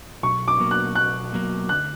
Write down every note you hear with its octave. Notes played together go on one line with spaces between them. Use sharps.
B1 C#6
D6
B2 F#3 A#3
F#6
B1 F#6
B2 F#3 A#3
D2 F#6